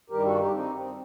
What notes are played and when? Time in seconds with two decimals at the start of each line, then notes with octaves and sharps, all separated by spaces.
0.10 G2 D#3 G3 G4 A#4
0.24 F#4 A4
0.38 D#4 G4
0.52 C4 D#4
0.75 C4